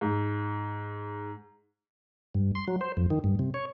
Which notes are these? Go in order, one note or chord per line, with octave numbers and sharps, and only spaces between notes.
G#2
G2
C6
F#3
C5
F2
D#3
G2
C3
C#5